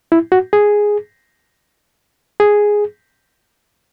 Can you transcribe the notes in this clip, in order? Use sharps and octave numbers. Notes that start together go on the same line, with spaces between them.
E4
F#4
G#4
G#4